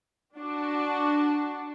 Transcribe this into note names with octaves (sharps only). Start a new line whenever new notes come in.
D4 F#4 A5